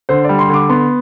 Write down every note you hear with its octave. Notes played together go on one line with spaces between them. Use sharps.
D3 C5
G3 D5
C6
D3
D6
B3 C6